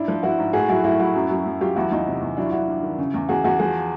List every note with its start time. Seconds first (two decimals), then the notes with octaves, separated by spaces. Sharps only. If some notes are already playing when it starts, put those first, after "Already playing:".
Already playing: G#2 D4 E4
0.08 F3
0.23 F3 E4 F#4
0.38 G#2
0.53 A2 F#4 G#4
0.68 F#3 E4 F#4
0.84 A2 E4 F#4
1.00 F#3 E4 F#4
1.15 F#2
1.30 F#2
1.46 F#2
1.60 F#3 F4 G4
1.75 E2 E4 F#4
1.91 E2 D#4 F4
2.06 C3
2.21 E2
2.37 F#3 D4 E4
2.46 F4
2.52 G2 E4 F#4
2.68 G2
2.83 D#3
2.98 C#3
3.14 E2
3.29 E2 F#4 G#4
3.44 E2 F#4 G#4
3.59 F3 F#4 G#4